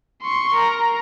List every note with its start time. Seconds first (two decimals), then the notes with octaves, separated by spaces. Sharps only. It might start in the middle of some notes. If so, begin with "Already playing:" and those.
0.22 C6 C#6
0.54 A#4 A#5